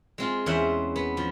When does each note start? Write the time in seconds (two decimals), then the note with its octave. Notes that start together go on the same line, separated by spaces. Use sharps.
0.18 G#3 C4 F4
0.46 E2 C4 C#4 C5 E5 F#5
0.96 B3
1.17 F3